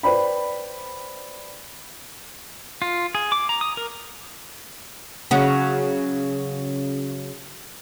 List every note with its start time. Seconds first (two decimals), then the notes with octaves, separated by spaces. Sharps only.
0.03 B4 C5 D5 G5 B5
2.82 F4
3.15 G#4
3.32 D6
3.49 A#5
3.61 D#6
3.77 A#4
5.31 C#3 F#3 F#4